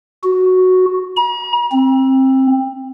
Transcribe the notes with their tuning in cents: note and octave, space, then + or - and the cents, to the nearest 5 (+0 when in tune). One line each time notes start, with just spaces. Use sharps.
F#4 +0
A#5 +45
C4 +20